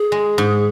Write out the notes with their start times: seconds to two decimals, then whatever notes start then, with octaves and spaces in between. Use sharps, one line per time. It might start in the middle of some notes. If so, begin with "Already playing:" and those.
Already playing: G#4
0.12 G#3
0.38 G#2